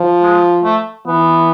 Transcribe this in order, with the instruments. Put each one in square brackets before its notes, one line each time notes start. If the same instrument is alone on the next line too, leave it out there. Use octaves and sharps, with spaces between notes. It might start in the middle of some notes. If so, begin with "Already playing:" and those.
Already playing: [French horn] F3
[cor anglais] G#3
A3
[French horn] E3 [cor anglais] B3